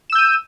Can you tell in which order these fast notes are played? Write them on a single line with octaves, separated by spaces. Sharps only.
E7 E6 G6 D#7